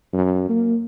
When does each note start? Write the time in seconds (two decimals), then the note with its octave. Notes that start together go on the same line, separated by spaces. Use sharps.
0.13 F#2
0.49 A#3